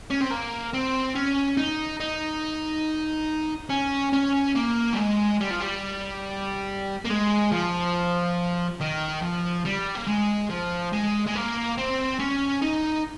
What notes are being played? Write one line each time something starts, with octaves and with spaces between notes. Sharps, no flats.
C#4
C4
A#3
C4
C#4
D#4
D#4
C#4
C#4
A#3
G3
G#3
G3
F3
G3
A#3
G#3
F3
D#3
F3
G3
A#3
G#3
F3
G#3
G#3
A#3
C4
C#4
D#4